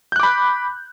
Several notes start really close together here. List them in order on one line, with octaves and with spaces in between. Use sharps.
G6 F#6 D6 B5